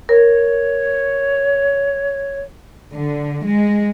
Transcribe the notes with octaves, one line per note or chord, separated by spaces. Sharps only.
A#4 C#5
D3
G#3